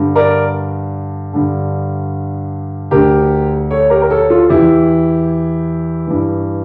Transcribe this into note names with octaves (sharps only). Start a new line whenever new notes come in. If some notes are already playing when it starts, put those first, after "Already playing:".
Already playing: G2 D3
A#4 D5
G2 D3
D2 D3 G4 A#4
A4 C#5
G4 A#4
A#4
A4 C#5
F4 A4
E2 E3 E4 G4
G2 E3